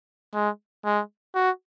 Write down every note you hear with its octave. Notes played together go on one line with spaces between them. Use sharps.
G#3
G#3
F#4